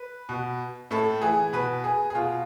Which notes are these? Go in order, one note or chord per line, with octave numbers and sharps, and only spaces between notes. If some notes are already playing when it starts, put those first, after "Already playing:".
Already playing: B4
B2
A2 A4
E3 G#4
B2 B4
G#4
G#4
B2 F4